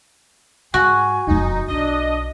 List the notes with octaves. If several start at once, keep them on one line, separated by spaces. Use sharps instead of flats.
G#2 F#4 G#5
E1 F2 D#4
B1 B2 D4 D#5